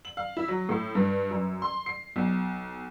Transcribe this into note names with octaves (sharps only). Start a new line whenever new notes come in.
F#7
F5
E4
F#3
A2
G2
F#2
C6
C7
B1